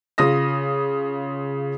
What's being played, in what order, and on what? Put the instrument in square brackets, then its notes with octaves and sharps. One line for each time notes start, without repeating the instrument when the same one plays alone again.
[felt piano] C#3 F4 D#6 A#6